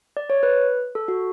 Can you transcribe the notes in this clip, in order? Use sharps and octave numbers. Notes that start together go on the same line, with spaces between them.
D5
C#5
B4
A4
F#4